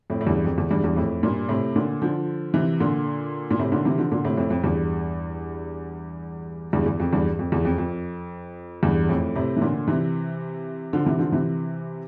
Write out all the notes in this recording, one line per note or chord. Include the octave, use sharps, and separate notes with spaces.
F2 A2
A2
E2 G2
F2
E2
E2 G2
E2 G2
F2 A2
G2 A#2
A2 C3
A#2 D3
D3 F3
C3 E3
A#2 D3
A#2
A2 C3
A#2 D3
C3 E3
D3 F3
A#2 D3
A2 C3
F2 A2
F2
E2 G2
E2 G2
E2
F2
E2 G2
F2
E2
F2
F2
E2 G2
F2 A2
A2 C3
E3
A#2 D3
C3 E3
D3 F3
C3 E3
D3 F3
C3 E3